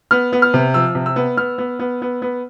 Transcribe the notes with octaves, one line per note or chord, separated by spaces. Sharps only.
B3 F6
B3
F6
C3
F3 E6
C3
E6
B3
B3 F6
B3
B3
B3
B3